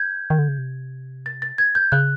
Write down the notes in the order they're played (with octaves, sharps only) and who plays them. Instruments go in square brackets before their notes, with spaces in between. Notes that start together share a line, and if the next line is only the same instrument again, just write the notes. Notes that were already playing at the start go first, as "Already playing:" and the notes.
Already playing: [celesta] G6 G#6
[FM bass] D#3
D3
C#3
C3
[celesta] A6
A6
G#6
G6
[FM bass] C#3 [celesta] F#6